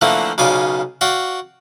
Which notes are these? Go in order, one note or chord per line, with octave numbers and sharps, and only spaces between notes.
D3 E3 F3 A3 A#3 C4
B1 C#3 F4 D5 G#5 D6
F#4 D5 F5 G5